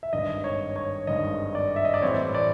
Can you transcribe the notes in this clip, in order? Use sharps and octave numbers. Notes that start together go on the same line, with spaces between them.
E5
G#1 G2 D#3 D#5
C#5
C#5
G#1 G2 D#3 D#5
D5
E5
D#5
D5
A2 E3 G3 C4 C#5
D5